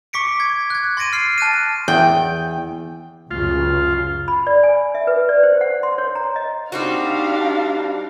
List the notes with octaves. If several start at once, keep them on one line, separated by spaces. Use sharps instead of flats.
C#6 D6 B6 C#7 D7
G#6
F#6 G#6
C6 A6 A#6 D7 D#7
F6 C7
A5 F#6 A6 D#7
E2 G5
C#2 F#2 C#3 F4
B5
D5
G#5
E5
B4
D5
C5
F#5
C6
C#5
A#5
D#5
G3 C4 D4 D#4 F#4 F5